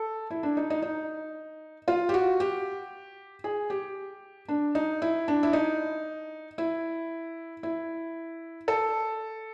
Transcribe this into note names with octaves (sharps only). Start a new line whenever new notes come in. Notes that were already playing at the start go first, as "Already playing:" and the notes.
Already playing: A4
E4
D4
D#4
D#4
D#4
F4
G4
F#4
G4
G#4
G4
D4
D#4
E4
D4
E4
D#4
E4
E4
A4